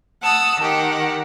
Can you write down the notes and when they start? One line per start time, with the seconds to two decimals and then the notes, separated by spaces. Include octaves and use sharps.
0.22 F#5 A5 D#6 E6
0.59 D#3 G4 F#5